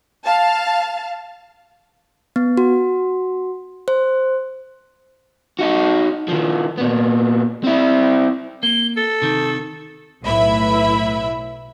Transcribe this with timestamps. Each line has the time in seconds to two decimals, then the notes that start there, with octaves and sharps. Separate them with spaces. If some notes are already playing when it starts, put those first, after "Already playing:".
0.24 F5 A5
2.36 B3
2.57 F#4
3.88 C5
5.59 D#4 F#4
6.28 D#3 F3
6.78 A#2 B3
7.64 C4 E4
8.63 A#3 G7
8.97 A4 A6
9.22 C3 D#3
10.23 B1 A2 E4 B4 E5 B5